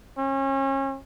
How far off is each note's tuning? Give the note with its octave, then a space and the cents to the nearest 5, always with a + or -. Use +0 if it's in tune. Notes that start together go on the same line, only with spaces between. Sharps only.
C#4 -30